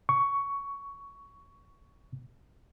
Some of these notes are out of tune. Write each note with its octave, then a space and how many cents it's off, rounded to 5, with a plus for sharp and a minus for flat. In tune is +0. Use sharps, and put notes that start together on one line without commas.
C#6 +10